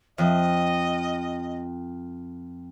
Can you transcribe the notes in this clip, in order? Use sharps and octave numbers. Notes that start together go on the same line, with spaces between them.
F2 D#5